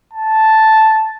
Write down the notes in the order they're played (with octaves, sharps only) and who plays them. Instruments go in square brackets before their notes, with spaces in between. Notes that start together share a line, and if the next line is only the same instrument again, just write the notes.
[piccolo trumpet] A5